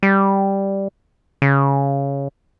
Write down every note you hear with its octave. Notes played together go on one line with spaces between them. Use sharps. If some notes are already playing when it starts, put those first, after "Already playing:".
G3
C#3